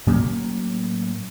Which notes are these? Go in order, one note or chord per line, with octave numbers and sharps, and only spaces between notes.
A2 F#3 A#3 C#4